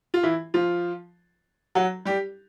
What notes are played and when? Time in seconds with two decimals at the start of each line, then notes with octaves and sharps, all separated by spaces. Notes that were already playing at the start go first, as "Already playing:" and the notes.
0.14 F4
0.23 E3 E4
0.54 F3 F4
1.75 F#3 F#4
2.05 G3 G4